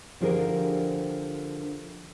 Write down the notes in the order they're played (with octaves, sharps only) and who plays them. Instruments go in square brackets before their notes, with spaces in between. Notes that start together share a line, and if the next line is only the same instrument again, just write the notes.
[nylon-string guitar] D3 F3 D4 G4 G#4 A#4